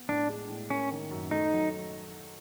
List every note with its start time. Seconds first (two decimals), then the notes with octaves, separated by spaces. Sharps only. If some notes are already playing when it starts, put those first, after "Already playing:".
Already playing: B3
0.09 A2 D4
0.29 G#3
0.50 A2
0.70 A#3 C#4
0.91 D#3
1.11 F#2
1.31 A3 D#4
1.52 F#3